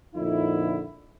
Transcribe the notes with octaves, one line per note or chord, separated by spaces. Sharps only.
F2 A#2 D3 D#4 E4